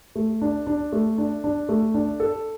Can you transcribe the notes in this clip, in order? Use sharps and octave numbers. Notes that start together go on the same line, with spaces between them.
A3
D4
D4
A3
D4
D4
A3
D4
A4